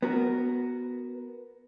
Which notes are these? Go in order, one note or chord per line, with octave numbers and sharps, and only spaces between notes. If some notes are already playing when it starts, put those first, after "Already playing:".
B3 F#4 A#4